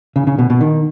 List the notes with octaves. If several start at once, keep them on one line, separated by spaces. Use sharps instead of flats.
C#3
C#3
B2
B2
D#3